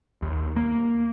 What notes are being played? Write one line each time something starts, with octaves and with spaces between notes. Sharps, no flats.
D#2
A#3